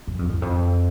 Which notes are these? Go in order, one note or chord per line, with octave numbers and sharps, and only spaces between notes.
F#2
F2
E2
F2